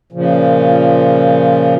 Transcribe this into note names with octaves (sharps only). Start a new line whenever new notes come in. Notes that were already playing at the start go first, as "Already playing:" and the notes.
A#2 C#3 F3